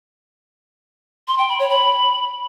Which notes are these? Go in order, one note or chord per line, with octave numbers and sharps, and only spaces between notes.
C6
G5
B5
C#5
B5